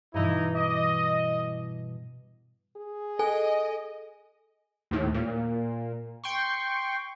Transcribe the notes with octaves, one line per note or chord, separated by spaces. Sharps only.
G2 B2 E3 D#4 E4
D#5 D6 D#6
G#4
A4 D#5 G#5
D#2 A2
A#2
G5 C6 C#6